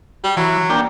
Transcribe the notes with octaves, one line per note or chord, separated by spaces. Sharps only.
G3
E3 F#3
A#3 D4 G5